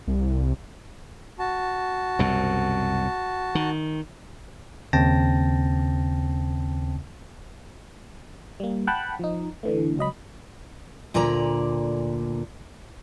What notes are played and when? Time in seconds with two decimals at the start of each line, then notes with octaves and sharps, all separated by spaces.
0.08 C2
1.39 F#4 A5
2.19 C2 F#2 B2
3.55 D#3
4.93 D#2 C#3 C4 G5 A5 A#6
8.60 G3 A#3
8.87 F#5 G5 A5 B5 F#6
9.19 F3 D#4
9.63 D3 E3 A3
9.97 C#2 F#3 D#5 B5
11.14 D2 A#2 D3 D5 A#5